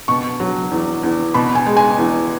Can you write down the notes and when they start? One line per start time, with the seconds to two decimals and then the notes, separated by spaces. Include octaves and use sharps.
0.08 B2 C#6
0.40 F#3
0.71 E2
1.03 E2
1.34 B2 B5
1.55 G#5
1.66 G#3
1.77 G#5
1.98 E2